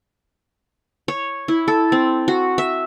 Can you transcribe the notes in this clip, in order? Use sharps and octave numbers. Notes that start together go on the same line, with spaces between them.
C#5
E4
A4
C4
F#4
E5